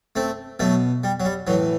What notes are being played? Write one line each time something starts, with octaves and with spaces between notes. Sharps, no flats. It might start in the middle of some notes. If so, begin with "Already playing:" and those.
A3 C4
B2 F#3 A3
G3
F#3
G3
A2 E3 F#3